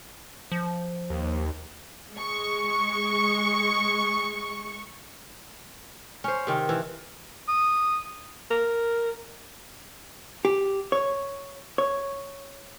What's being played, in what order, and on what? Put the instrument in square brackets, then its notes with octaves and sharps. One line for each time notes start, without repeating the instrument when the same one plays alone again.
[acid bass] F3
[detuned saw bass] D#2
[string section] G#3 C#6
[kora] C#4 C5
C3 D#3
E3
[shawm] D#6
[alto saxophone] A#4
[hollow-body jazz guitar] G4
C#5
C#5